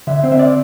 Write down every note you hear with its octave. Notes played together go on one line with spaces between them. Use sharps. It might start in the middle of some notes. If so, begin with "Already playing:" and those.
D3 E5
C4
E5
D5